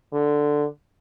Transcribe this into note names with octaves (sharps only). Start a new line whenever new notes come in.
D3